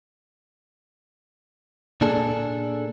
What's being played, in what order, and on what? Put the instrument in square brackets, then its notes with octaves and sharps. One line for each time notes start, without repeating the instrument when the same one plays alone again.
[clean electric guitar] A#2 A#3 D4 G#4 A4